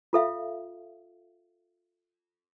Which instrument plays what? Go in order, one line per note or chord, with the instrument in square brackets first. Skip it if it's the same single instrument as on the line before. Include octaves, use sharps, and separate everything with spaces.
[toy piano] F4 A4 E5 F5